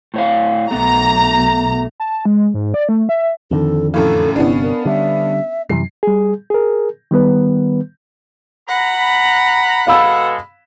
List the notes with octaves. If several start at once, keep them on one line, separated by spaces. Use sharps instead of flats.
A2 C#5 F5
B1 A3 B3 A#5
A5
G#3
G#2
D5
A3
E5
F2 D3 D#3 C4 A4
F#2 A2 E3 A4 F5 B5 C#6
G1 C3 B3 C#4 D4 E4
A#4
D3 G3 E5
F#2 C3 E3 G3 C7
G3 G#4
G#4 A#4
D#3 G3 B3 B4
F#5 A#5 B5
B2 G#3 A4 F5 B5 E6